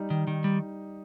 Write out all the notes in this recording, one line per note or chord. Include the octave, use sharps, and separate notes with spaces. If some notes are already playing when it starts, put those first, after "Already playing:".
Already playing: G3 D#4
D#3
D#3
G3